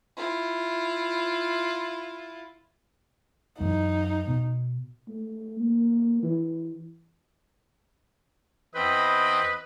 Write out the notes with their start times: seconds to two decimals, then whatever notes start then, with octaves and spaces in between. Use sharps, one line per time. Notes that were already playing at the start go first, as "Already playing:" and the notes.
0.17 E4 F4
3.60 F#2 E3 D#4
4.28 B2
5.08 A3
5.60 A#3
6.23 E3
8.75 E2 C4 B4 D#5 G5